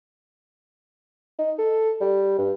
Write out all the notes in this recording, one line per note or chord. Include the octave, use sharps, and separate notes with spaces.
D#4
A4
G3
G2